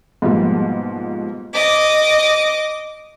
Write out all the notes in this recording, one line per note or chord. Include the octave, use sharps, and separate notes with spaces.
G#2 B2 F3 G3 A#3
D#5 D6